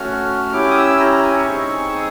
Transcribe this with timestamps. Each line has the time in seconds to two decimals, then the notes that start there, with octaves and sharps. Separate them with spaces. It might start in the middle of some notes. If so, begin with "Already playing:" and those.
Already playing: A3 C#4 F#4 F6
0.52 C#4 E4 G4 D6
0.71 D#6
0.77 E6
1.00 A#5
1.12 A#5
1.23 G#5
1.36 C#6
1.47 C4 D#4 G#4
1.89 E6
1.95 D#6